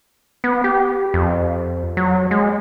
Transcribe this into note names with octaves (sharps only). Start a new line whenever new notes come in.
B3
G4
F2
F#3
G#3